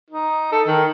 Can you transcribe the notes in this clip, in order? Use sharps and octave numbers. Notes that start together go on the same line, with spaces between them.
D#4
A4
D#3